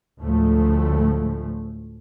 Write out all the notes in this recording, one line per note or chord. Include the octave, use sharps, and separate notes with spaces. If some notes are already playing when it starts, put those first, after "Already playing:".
D2 A2 F3 G#3 A3